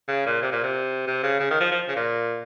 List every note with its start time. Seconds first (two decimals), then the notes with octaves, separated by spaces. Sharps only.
0.08 C#3
0.26 A#2
0.42 C3
0.52 A#2
0.63 C3
1.07 C3
1.23 C#3
1.40 C#3
1.51 D#3
1.61 F3
1.71 F3
1.88 C#3
1.96 A#2